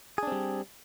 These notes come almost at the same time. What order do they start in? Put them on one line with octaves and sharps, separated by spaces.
G#4 D4 C4 G3